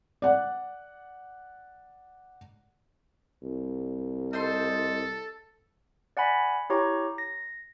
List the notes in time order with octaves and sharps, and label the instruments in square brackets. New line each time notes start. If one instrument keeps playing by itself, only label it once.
[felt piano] D5 F#5
[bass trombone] C2
[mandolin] D#4 C5 C6 [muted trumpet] A4
[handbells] D5 F#5 G#5 B5 B6
E4 G4 C#5 G5 A#5 C#6
A#6